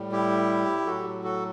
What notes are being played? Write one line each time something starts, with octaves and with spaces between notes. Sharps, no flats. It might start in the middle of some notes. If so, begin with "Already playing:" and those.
Already playing: A2 G3
E4 G4
A2 F#3 F#4 A4
F#4 A4